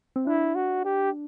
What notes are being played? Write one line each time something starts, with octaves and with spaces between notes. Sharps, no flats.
C4
D4 E4
F#4
G4